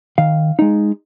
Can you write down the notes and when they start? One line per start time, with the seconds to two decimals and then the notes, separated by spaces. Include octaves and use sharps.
0.18 D#3 F5
0.59 G#3 D#4